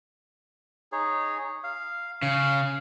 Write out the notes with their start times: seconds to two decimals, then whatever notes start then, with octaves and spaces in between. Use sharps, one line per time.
0.92 D#4 G#4 C#5
1.64 F5
2.22 C#3 F5